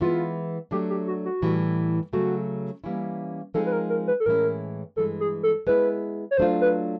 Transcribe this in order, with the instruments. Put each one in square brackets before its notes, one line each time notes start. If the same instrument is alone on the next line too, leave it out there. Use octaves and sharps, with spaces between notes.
[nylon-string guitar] E3 G#3 B3 E4 [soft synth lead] F4
[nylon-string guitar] F#3 A3 D4 [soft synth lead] G4
[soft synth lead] G4
F#4
F#4
[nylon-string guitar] A2 E3 G3
[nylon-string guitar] C#3 F#3 A3 [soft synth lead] F#4
[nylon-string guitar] E3 G3 A#3 C#4 E4
[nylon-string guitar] F3 G#3 C4 D#4 G#4 [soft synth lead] A4
[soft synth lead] B4
A#4
A#4
B4
A4
[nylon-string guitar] A2 E3 G#3 C#4 E4 [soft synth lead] A#4
[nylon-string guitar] G2 E3 G#3 [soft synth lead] A4
[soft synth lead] G#4
A4
[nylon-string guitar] G#3 B3 E4 [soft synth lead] B4
[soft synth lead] C#5
[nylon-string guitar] F#3 A3 D4 F4 [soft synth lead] C5
[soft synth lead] B4